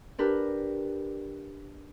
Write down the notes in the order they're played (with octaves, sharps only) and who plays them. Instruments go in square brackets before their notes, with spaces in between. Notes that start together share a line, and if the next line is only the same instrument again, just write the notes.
[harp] D4 G4 A#4 B4